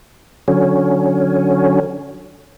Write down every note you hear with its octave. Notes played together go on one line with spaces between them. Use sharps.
D3 F#3 C#4